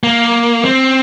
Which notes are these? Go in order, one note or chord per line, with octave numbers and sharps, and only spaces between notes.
A#3
C4